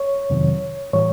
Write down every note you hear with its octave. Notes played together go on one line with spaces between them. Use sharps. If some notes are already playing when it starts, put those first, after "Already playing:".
Already playing: C#5
F2 C3 D#3 F#3
A2 E3 G3 C#5